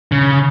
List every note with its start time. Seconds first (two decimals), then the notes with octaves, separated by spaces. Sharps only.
0.12 C#3